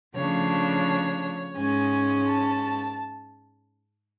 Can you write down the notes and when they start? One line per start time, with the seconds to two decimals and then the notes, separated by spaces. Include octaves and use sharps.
0.15 C#3 F3 A3 D4 C#5
1.56 G#2 G#3 C#4 G#5
2.28 A5